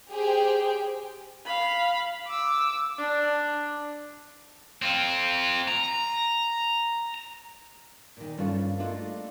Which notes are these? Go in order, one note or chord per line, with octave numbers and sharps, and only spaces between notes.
G4 G#4 C5 G5
F5 B5
D6 E6
D4
C4 F4
A#5
A#2 D#3
G2 C#4 D4 F4 A4
A3 A#3 D4 F4 A4 D#5